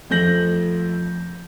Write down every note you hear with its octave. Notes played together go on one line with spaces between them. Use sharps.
F2 F3 A3 G6 A#6 F#7